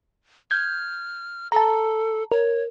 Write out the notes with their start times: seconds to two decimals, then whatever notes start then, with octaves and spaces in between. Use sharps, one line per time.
0.51 F6 G6 G#6
1.52 A4 A5 A#5
2.32 A#4 C#5